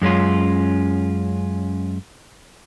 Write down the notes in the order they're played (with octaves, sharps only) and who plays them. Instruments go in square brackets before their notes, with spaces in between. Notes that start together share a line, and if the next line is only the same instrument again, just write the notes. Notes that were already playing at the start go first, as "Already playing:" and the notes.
[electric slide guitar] F#2 G#3 C#4 F4